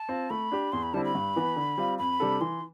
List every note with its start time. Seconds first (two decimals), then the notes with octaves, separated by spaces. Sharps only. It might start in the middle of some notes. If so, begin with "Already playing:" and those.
Already playing: A5
0.09 C4 F4
0.30 A3 B5
0.52 D4 G4
0.72 E2 C6
0.83 B5
0.93 D3 G3 C4 E4 A5
1.04 B5
1.15 G2
1.36 E3 B3
1.56 D3
1.78 G3 C4 F4
1.99 F2 B5
2.20 C3 G3 D4 A4
2.41 E3 C6